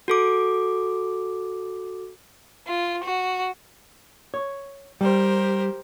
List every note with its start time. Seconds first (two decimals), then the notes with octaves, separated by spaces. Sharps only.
0.08 F#4 A4 D6
2.68 F4
3.03 F#4
4.34 C#5
5.01 G3 G4 A#4 C5